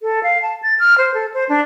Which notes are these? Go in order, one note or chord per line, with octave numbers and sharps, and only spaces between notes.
A4
F5
A5
A6
F6
C5
A4
C5
D4